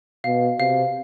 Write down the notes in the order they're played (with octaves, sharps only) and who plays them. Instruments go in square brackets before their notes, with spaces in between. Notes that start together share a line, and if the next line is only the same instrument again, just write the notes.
[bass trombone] B2 [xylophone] F5
[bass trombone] C3 [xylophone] F5